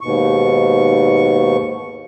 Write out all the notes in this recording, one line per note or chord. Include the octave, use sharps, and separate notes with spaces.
D#2 G#2 B2 C#6